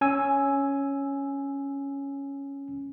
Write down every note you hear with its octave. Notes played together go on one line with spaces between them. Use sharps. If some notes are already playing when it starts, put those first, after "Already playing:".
C#4 G#5 E6